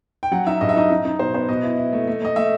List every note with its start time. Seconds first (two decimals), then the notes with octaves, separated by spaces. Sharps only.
0.23 G5
0.32 F#3 F#5
0.47 D#4 E5
0.61 G2 D#5
0.69 E5
0.76 D#4 D#5
0.90 D#4
1.05 D#4
1.19 B2 C5
1.34 B3 C5
1.49 B2 D#5
1.63 E4
1.78 E4
1.93 A3
2.07 A3
2.22 A3 D#5
2.36 A3 E5